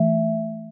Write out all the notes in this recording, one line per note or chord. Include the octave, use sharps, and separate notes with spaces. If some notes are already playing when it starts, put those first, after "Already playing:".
Already playing: E3 A3 E5